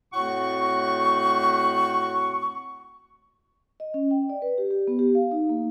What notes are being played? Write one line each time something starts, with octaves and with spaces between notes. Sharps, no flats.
F2 A2 A3 F#4 F#5 C#6
D#5
C#4
G5
D5
B4
G4
G4
B3
G4
F5
D#4
A#3